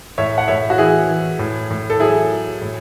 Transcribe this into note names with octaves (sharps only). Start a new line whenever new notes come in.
A2 C#5 E5
F#5
A2 C#5 E5
F#4
E3 E4 G#4
E3
A2
A2
A4
F#3 E4 G#4
F#3
A2